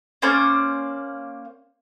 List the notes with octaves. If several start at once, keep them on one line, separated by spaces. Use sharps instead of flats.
A#3 C#4 C5 D5